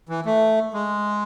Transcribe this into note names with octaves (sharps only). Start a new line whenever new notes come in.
E3
A3
G#3